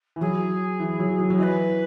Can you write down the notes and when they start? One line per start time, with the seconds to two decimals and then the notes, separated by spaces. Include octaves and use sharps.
0.16 E3
0.21 F#3 G#4
0.80 E3
0.99 F#3
1.19 F#3
1.30 F#3
1.38 E3 D#5
1.43 B4